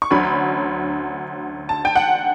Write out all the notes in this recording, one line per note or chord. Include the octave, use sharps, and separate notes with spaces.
C#6
D2 D3 F#3 C#4 B5
A5
G5
F#5